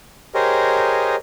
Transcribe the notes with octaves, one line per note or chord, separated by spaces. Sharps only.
G4 G#4 A#4 C5 C#5 D#5